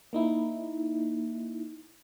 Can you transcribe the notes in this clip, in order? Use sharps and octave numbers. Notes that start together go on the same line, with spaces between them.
A#3 D#4 E4